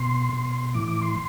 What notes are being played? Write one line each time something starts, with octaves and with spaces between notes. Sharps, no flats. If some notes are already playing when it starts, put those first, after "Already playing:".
Already playing: B2 C6
B2
A2 E3 D6
D6
C6